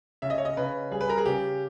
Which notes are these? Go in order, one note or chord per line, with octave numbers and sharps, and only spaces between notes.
C#3 E5
D#5
C#5
D#5
C#3 B4
G3 G#4
B4
A#4
G#4
C#3 G4